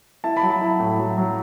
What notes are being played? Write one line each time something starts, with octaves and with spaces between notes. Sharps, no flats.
E4 A5
B5
F#3
A5
E4
A2
F#3
F#3